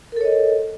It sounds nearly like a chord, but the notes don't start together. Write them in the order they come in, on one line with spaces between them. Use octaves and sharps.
A#4 A4 C#5 D#5